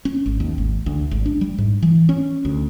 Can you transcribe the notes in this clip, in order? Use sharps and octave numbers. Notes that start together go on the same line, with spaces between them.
C#4
G#1
D#2
G#1
D2
G#1
D4
G3
G#2
E3
C#4
D2